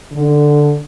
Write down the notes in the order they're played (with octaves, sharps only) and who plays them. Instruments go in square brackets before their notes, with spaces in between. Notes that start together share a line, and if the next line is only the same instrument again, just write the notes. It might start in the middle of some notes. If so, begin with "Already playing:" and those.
[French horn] D3